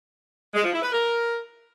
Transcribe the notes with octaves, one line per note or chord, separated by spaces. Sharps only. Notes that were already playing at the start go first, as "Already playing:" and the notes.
G#3
F3
E4
B4
A#4